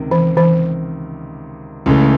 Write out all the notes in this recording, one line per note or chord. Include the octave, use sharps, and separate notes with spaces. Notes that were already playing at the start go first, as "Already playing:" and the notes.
Already playing: C#2 C3 D#3
E3
E3
C#2 C#3 E3 A3